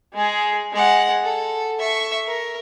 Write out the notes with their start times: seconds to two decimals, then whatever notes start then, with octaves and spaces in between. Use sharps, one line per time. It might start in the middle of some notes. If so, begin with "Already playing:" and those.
0.14 G#3 G#4
0.72 G#3 F#5
1.23 A4
1.79 E5 C#6
2.26 A#4